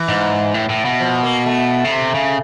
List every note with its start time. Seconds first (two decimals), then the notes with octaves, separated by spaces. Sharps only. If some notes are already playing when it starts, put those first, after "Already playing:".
Already playing: E3
0.09 G#2
0.54 A2
0.69 A2
0.85 B2
1.00 F3
1.23 A#3
1.46 A3
1.84 C#3
1.91 C3
2.14 C#3